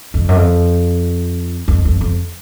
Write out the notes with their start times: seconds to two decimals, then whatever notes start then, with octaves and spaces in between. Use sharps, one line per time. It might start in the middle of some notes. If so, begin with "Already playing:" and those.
0.14 F2
0.28 F#2
0.36 F2
1.68 F2
1.85 F2
2.01 F2